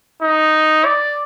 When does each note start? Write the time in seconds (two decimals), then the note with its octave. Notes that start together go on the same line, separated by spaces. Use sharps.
0.22 D#4
0.85 D5